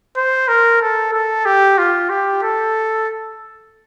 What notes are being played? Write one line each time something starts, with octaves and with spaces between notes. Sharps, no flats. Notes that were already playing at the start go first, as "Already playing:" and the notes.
C5
A#4
A4
A4
G4
F4
G4
A4